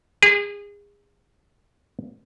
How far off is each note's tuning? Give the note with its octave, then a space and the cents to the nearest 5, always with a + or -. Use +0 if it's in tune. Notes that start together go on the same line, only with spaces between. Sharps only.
G#4 -30